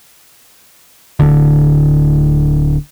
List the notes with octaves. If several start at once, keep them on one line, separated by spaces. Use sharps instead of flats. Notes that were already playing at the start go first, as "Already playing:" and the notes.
D1 D3